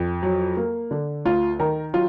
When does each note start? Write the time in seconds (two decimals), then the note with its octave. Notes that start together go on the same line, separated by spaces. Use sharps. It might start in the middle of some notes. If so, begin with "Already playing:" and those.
Already playing: F2
0.23 F#3
0.57 A#3
0.91 D3
1.25 D2 F4
1.60 D#3 A#4
1.94 F#3 F4